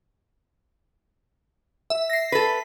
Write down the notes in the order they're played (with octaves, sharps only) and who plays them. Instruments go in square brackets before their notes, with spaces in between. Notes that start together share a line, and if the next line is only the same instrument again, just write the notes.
[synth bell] E5
A#6 C7
[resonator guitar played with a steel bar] A4 B4 [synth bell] B6